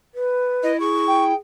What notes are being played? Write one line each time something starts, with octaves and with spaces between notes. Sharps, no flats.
B4
E4 D#5
G#4 C#6
G5